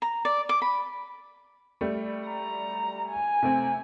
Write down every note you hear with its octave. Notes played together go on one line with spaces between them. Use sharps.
A#5
D5
D6
B5
G3 A3
A#5
G#5
C3 A3 C4